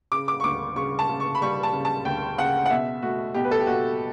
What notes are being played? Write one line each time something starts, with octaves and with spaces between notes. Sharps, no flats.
C#3 D6
D6
C#6
D2 D6
C#3 C#6
A5
C#3
C#6
B5
G3 C#6
A5
C#3
A5
D2 G5
C#3 F#5
F#5
B2 E5
A3 F#4
B2 G4
B4
A4
G4
B2 F#4